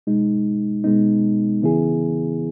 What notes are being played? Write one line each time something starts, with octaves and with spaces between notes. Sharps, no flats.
B2 G#3 D#4
B2 G#3 B3 D#4
C#3 E3 B3 E4 G#4